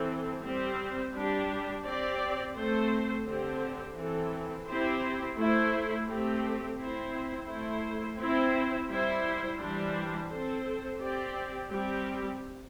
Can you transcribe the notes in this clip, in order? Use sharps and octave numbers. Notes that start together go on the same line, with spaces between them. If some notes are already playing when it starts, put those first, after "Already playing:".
Already playing: E3 C4 A4
G3 C4 G4 C5
G3 D4 G4
C4 G4 D5
A3 C4 A4 C5
D3 C4 G4 C5
E3 C4 A4
C4 E4 G4 C5
A3 E4 C5
A3 C4 G4
C4 E4 C5
A3 E4 C5
C4 E4 C5
G3 E4 C5
E3 G3 D4 G4 C5
C4 A4 C5
C4 G4 D5
G3 C4 G4